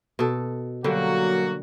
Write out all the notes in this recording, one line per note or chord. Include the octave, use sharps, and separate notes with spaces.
B2 A4
D3 F#3 G3 A#3 F#4